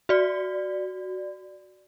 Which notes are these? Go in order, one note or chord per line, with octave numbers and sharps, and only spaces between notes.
F#4 D5